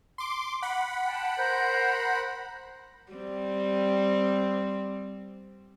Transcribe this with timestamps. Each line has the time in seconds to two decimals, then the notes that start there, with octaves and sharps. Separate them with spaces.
0.18 C6 D6
0.62 F#5 B5
1.04 G5 A5
1.37 A#4 C5 G6
3.12 G3 C4